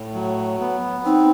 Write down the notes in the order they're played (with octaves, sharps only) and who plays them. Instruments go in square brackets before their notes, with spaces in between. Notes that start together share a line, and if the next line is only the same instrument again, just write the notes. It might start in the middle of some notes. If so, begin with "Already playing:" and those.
Already playing: [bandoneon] A2
F#3
B3
[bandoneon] C4 [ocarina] D#4